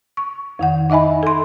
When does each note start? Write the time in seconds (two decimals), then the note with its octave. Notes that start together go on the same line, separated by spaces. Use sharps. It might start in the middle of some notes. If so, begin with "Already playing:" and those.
0.17 C#6
0.59 F2 D#3 F#5
0.90 D#4 D#5 E5 G#5 B5
1.23 A4 C6